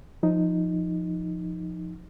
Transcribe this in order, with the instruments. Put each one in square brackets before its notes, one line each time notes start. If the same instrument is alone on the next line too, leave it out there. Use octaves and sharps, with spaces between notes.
[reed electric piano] F3 D#4